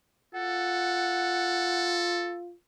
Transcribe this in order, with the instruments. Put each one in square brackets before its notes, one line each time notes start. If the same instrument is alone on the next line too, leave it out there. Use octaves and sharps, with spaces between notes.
[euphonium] F4 [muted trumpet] A4 [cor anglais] F#5